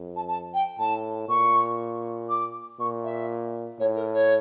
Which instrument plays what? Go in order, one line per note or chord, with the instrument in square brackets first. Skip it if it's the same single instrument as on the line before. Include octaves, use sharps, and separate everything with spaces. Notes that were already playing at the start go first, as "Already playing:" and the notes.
Already playing: [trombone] F2
[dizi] A5
A5
G5
[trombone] A2 [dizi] A5
[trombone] A#2 [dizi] C#6
[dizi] D6
[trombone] A#2 [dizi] C#6
[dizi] E5
[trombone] A2 [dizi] C#5
[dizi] A#4
C#5